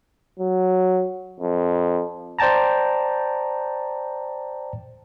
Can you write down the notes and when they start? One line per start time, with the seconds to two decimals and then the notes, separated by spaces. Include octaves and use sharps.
0.39 F#3
1.40 F2
2.39 C5 D5 G5 A5 A#5